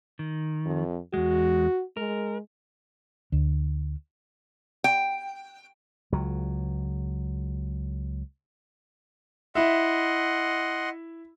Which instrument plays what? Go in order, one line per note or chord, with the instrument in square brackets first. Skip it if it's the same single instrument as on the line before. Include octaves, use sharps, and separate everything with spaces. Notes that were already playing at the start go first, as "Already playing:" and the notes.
[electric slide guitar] D#3
[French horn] F2
[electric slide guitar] E2 G#3 [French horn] F#4
[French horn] G#3 [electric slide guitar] A#4
[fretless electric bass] D2
[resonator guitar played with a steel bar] G5
[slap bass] C#2 F#3
[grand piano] E4 E5 [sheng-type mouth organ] D#5 F#5 C6